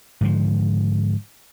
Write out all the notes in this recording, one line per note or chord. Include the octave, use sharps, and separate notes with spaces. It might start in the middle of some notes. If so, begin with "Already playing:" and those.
G#2 D3 F3